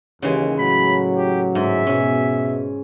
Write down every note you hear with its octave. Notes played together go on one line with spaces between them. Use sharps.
D#2 C#3 E3 G#3
A2 F#3 B5
G4
G#2 E5
B2 C#4